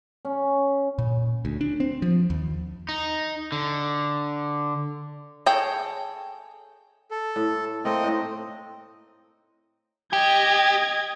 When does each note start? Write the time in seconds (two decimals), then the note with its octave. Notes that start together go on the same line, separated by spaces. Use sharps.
0.25 C#4
0.98 A#2
1.45 D2
1.61 D4
1.80 C4
2.02 F3
2.30 D#2
2.89 D#4
3.52 D3
5.46 G#4 A4 C#5 G5
7.11 A4
7.36 A2
7.85 A3 A#3 C4 D#5
8.04 A2 D#4
10.13 G4 D#5 G#6